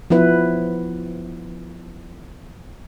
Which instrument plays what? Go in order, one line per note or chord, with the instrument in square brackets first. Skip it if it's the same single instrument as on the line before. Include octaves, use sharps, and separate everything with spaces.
[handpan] F3 B3 E4 B4